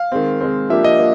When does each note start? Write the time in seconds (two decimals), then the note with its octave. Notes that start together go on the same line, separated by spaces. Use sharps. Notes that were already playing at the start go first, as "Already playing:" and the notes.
Already playing: F5
0.12 D#3 G#3 C4
0.41 D#3 G#3 C4
0.69 F3 A#3 D4 G4 E5
0.84 D#5
0.99 F3 A#3